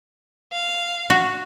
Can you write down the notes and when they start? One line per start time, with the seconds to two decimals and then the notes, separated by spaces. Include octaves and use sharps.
0.53 F5
1.10 F#4